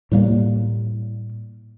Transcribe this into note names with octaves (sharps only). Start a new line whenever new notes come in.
A2 G3 A#3